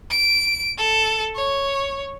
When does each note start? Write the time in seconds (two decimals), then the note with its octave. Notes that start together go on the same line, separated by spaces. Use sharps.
0.11 D7
0.78 A4
1.36 C#5